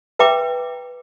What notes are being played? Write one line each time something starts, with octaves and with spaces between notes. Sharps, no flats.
B4 E5 G5 A#5 D6